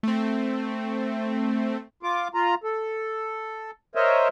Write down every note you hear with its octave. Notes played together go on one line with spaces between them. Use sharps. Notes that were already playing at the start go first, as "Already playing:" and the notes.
A3 C4
F4 D6
F4 A#5
A4
A#4 C5 C#5 D#5 E5